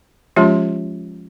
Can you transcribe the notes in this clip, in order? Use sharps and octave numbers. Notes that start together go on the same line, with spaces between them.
F3 G#3 C#4 F4 G4